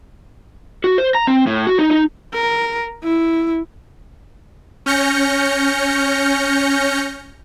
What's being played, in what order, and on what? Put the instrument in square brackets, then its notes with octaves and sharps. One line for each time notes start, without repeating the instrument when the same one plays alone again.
[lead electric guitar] F#4
C5
A#5
C4
A2
F#4
D#4
D#4
[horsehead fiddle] A#4
E4
[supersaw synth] C#4 F6 G6 A#6 C#7